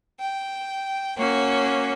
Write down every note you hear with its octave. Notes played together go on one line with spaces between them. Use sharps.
G5
A#3 C#4 F#4 C#5